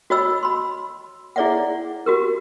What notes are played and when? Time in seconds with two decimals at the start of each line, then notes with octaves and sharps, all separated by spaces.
0.10 F#4 C#5 D#5 B5 E6
0.43 B5 C6
1.36 E4 G#4 C#5 D5 E5 F#5
2.06 F#4 G4 A#4